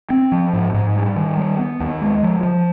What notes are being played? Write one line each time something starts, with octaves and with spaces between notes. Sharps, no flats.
C4
F3
G#2
G#2
G3
D#3
G3
B3
D#2
G#3
F3
F3